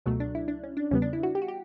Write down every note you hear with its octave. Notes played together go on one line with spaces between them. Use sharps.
C#2 B2 F#3 A3
D4
E4
D4
C#4
D4
E2 C#3 G3 B3 C#4
D4
E4
F#4
G4
F#4
G4